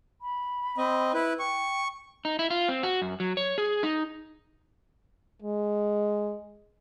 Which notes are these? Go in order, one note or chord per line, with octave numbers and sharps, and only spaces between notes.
B5
C4 D#5
E4 B4
G5 C#6
D#4
E4
F4
C4
F#4
F#2
F#3
C#5
G#4
D#4
G#3